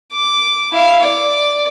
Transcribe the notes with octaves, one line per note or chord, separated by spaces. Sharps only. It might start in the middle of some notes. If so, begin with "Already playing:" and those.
D6
E4 F5
D5